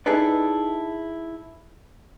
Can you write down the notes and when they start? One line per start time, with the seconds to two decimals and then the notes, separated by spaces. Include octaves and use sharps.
0.06 D#4 E4 G#4 A4 B4 D5